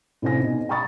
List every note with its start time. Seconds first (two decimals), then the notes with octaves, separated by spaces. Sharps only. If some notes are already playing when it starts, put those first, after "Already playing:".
0.22 A2 C3 C5 G#5 A#6
0.40 B2 D#4
0.69 G5 A#5 B5 C#6 D#6 A6